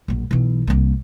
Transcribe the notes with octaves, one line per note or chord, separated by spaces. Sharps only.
A#1 F#2
B1 E3
C2 A#3